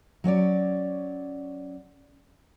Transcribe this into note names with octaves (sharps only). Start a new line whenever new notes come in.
F#3 C#4 C#5 D5